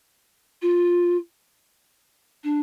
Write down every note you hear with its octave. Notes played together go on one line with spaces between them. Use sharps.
F4
D4